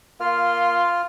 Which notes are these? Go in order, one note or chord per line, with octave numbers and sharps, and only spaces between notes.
A#3 F4 C6 F6